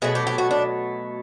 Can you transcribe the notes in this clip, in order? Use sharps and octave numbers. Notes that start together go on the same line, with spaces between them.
B2 F#3 A3 G#4
G4
G4
F#4
D4